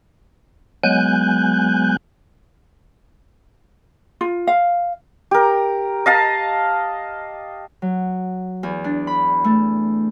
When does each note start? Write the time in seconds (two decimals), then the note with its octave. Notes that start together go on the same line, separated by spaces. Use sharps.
0.84 F#3 G#3 B3 G#5 F#6 G6
4.21 F4
4.47 F5
5.31 G4 A#4
6.06 D#5 F5 A5
7.82 F#3
8.63 E2
8.84 D4
9.07 B5
9.44 A3